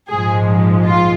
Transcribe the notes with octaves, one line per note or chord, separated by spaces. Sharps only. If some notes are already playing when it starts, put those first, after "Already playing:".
A#1 G#2 F3 G#3 G#4
F4